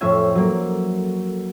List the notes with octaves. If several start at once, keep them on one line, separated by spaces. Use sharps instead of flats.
F2 A2 C#4 E5 G#6
F#3 A#3